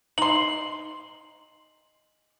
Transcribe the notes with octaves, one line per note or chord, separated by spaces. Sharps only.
D#4 C6 F#7